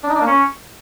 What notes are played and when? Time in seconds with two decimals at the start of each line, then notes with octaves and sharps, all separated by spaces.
0.03 D4
0.09 D#4
0.15 D4
0.21 A#3
0.27 C#4